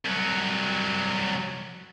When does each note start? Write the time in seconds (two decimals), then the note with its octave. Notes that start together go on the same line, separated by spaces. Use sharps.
0.05 C2 F#3